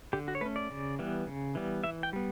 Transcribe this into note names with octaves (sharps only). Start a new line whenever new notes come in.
D3 G4
F#4
C#5
A3 C#4 B4
D5
C#3
E3 G3 B3
C#3
E3 G3 B3
E3 E5
G5
G3 B3